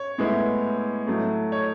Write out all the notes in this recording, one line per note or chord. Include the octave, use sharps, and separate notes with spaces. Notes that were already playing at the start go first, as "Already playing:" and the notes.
Already playing: C#5
A2 G#3 B3 E4
A2 F#3 A3
C#5